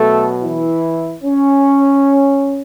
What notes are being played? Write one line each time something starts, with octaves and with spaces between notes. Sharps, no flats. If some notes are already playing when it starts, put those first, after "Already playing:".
Already playing: B2 F#3 A3 A4
E3 E4
C#4